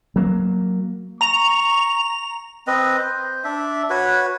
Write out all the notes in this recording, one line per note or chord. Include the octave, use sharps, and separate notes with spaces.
F#3 A#3
A#5 C#6 F7
C4 B4 D#5
C5
D4 E5
F#4 B4 C#5